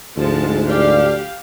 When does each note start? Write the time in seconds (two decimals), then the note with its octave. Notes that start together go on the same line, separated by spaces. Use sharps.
0.17 D2 G#2 F3 G#3 A5
0.69 D4 G4 B4 D5 F5